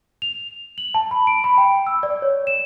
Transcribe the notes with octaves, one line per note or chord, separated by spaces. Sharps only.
F7
F#7
A5
B5
D7
B5
G5
E6
D5
C#5
E7